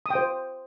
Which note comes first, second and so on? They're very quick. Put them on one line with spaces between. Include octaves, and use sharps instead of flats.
D#6 G5 C5